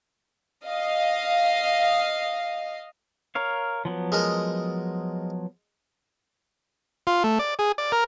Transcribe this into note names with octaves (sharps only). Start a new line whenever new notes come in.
D#5 F5
A#4 C#5 F5
F3 F#3 B3
G#3 A#4 D#5
F4
A3
D5
G#4
D5
A#4